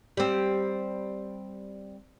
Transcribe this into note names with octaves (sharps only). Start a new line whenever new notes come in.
G3 C4